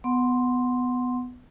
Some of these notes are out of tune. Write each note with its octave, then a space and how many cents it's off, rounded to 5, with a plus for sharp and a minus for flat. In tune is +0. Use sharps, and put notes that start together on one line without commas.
B3 +15 F#5 -10 C6 +0